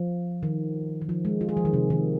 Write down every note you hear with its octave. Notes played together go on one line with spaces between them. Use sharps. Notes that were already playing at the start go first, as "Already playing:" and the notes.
Already playing: F3
D#3
D#3
F3
G#3
F4
G#4
F3
D#3
C3
D#3